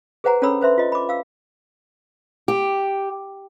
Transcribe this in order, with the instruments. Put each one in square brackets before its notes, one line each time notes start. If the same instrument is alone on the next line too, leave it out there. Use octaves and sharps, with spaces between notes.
[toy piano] G#4 B4 C5 F#5 G#5 A#5
C#4 D4 A4 C#5 B5 E6
B4 C5 E5 C6
F4 D#5
B5 D6
F5 E6
[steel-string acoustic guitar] G4